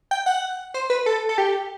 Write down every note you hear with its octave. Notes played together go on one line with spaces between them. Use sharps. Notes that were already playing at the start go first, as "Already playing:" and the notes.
G5
F#5
C5
B4
A4
A4
G4